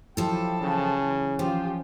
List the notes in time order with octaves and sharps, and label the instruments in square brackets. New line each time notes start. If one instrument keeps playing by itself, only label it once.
[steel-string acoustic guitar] F3 A4 [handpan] F#3 E4 G4 [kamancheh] G5 A5
[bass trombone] C#3 [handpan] E3
[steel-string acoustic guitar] F3 [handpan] C#4 C5 [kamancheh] F4 G4